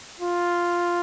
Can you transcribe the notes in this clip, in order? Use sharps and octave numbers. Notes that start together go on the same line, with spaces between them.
F4